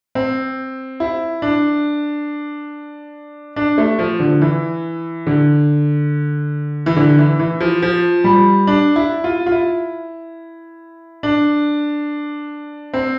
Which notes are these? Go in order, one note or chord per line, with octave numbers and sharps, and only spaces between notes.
C4
E4
D4
D4
A3
F3
D3
E3
D3
E3
D3
E3
E3
F3
F3
G3
D4
E4
F4
F4
E4
D4
C4